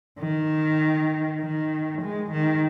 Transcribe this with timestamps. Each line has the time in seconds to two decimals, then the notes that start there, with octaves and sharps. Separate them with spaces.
0.20 D#3
1.40 D#3
2.02 G#3
2.31 D#3